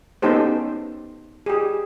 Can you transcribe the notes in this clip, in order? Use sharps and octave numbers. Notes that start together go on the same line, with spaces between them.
B3 C#4 D#4 G4 A4 C5
G4 G#4